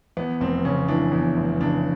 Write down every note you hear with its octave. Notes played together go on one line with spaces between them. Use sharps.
E2 B3
F1 C4
C#3 C#4
E3 D4
E2
F1
C#3 D4